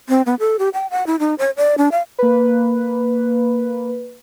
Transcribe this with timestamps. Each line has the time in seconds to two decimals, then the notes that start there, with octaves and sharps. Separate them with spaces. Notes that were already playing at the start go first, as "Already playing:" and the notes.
0.09 C4
0.26 B3
0.40 A4
0.59 G4
0.74 G5
0.91 F#5
1.07 E4
1.19 D#4
1.38 C#5
1.57 D5
1.78 D4
1.92 F5
2.19 A#3 B4